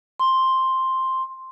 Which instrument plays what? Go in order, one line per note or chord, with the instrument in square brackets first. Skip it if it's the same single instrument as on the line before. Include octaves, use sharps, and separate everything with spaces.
[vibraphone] C6